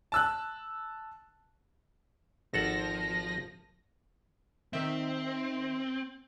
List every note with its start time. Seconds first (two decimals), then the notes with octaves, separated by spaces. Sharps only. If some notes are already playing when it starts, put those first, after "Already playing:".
0.12 A5 E6 F#6
2.53 G#1 F3 A4 F#5 A#6
4.73 D#3 C4 E5